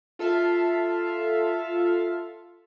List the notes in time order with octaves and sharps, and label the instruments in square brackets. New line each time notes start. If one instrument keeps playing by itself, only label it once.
[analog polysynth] F4 A4 E5 F5